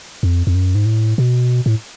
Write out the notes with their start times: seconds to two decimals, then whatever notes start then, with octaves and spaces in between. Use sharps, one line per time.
0.23 F2
0.47 F2
0.55 F#2
0.75 G#2
0.86 A2
1.18 B2
1.66 A2